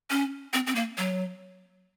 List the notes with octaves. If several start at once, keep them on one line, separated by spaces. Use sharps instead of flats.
C#4
C4
C4
A#3
F#3